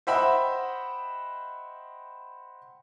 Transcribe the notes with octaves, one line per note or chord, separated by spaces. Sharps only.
C5 D#5 E5 F#5 G5 B5